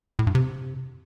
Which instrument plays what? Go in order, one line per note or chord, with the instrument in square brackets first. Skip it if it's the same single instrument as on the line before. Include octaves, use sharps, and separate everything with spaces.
[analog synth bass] A2
G2
C3